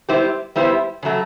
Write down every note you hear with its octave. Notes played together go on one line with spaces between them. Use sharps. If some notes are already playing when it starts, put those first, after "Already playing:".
G3 B3 E4 G4 C5
G3 B3 E4 G4 C5
C#3 F#3 A3